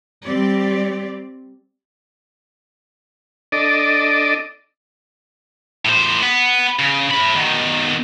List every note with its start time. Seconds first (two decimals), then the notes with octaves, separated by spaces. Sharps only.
0.24 G3 C4 G4 D5
3.52 D4 A4 D5 D#5
5.85 A2 C5
6.22 B3
6.79 C#3
7.11 A3 B5
7.36 B2 D#3